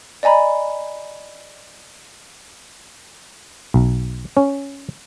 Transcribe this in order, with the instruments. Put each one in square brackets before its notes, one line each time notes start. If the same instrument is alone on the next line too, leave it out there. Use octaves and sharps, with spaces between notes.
[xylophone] D5 D#5 G#5 A#5 B5
[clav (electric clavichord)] B1
C#4